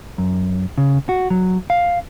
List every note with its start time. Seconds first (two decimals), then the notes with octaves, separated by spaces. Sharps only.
0.18 F#2
0.78 C#3
1.09 F#4
1.30 F#3
1.70 F5